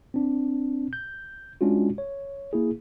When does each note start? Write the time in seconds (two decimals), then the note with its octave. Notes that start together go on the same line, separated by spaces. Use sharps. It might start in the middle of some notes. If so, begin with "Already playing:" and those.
0.14 C4 D4
0.93 G6
1.61 G#3 C#4 D4 F4 F#4
1.98 C#5
2.53 A#3 E4 G#4